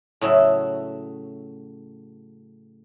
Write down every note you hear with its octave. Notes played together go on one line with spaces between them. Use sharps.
A2 C#3 F#3 E5